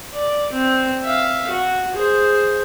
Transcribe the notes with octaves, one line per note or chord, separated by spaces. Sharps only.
D5
C4
E5 F5
F#4
G#4 C5